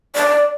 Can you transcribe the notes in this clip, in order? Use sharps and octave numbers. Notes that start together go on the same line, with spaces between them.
D5